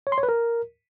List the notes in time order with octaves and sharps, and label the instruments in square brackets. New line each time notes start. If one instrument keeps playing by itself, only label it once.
[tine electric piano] C#5
C6
C#5
B4
A#4